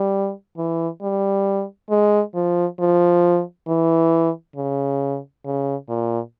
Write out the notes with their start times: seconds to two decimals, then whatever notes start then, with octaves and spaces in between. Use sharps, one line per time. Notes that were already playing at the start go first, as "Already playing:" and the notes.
Already playing: G3
0.57 E3
1.02 G3
1.90 G#3
2.35 F3
2.79 F3
3.68 E3
4.56 C#3
5.45 C#3
5.89 A#2